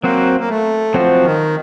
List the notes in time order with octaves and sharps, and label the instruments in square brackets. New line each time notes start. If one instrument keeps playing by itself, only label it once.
[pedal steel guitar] F#3 C4 F#4 C5 [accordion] A#3
[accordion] A#3
A3
[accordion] F3 [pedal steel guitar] F#3 C4 F#4 C5
[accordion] D#3